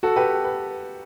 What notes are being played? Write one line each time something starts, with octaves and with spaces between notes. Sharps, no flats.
F#4 A4
G4 B4
B4